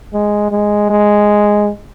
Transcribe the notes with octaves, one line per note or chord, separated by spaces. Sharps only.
G#3
G#3
G#3